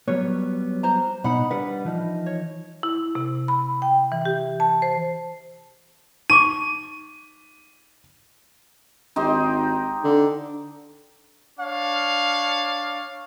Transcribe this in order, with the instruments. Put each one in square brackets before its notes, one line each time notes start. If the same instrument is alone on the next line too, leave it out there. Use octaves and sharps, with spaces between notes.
[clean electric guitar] F#3 G3 B3 [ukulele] C#5
[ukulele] C5 A#5
[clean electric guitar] B2 [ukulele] D#4 F#5 B5
[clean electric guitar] G3 D4 B4 [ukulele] F#5
[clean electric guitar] E3 F3 D#4
[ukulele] C#5
[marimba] E4
C3
B5
G5
E3
G4
A5
C5
[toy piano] D#4 C#6 D6 [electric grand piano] D#7
[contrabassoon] G#1 [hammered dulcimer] D#4 G4 C5
[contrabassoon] D3
[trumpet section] D4 C#5 F5